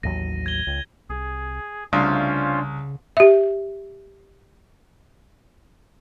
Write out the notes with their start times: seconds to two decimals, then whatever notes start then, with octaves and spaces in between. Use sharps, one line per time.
0.03 A1 D#2 F#3 A#6 D#7
0.46 G#6 G7
0.67 C#2
1.10 C2 G#4
1.93 C2 C#3 A3 C#4 D4 F4 C5 F5
3.17 G4 E5